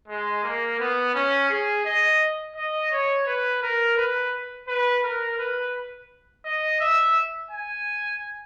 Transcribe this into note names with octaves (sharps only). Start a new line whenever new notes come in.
G#3
A#3
B3
C#4
G#4
D#5
D#5
C#5
B4
A#4
B4
B4
A#4
B4
D#5
E5
G#5